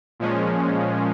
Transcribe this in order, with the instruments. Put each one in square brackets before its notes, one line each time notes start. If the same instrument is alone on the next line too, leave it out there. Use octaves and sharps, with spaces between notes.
[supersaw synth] A#2 F3 G#3 C#4